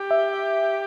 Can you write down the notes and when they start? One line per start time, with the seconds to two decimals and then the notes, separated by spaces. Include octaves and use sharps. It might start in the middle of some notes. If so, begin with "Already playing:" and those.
Already playing: G4
0.11 E5